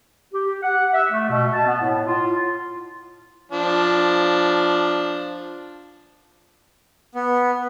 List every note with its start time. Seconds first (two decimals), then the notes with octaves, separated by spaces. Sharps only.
0.34 G4
0.63 F#5
0.93 E5
1.11 A3
1.30 B2
1.54 A5
1.67 B3
1.81 A2
2.07 F4
3.52 F3 D4
7.15 B3